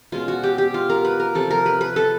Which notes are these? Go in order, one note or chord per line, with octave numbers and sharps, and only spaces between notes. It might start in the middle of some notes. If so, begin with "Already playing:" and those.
B2 G#3 C#4 F4
F#4
G4
G4
F4
A#4
B4
A#4
C3 F3 A3 A4
A#4
B4
B4
A4